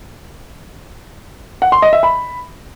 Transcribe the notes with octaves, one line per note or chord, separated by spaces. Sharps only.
F#5
C6
D#5
E5
B5